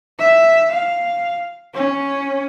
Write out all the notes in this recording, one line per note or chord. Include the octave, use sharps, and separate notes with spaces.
E5
F5
C#4